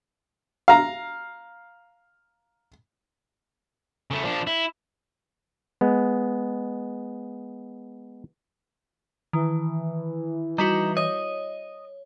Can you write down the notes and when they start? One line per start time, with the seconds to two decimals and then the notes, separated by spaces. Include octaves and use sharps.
0.68 F5 A#5
4.11 C#3 A3
4.23 F3 D4
4.47 E4
5.81 G#3 B3
9.33 D#3 E3
10.58 G3 D#4 E4 F#4
10.97 C#5 D#5